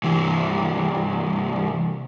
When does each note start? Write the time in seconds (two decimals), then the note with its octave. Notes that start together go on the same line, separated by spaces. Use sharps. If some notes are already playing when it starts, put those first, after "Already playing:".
0.03 C2 E3